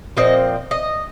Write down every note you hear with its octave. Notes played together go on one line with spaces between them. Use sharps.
A#2 F3 C4 D#5
D#5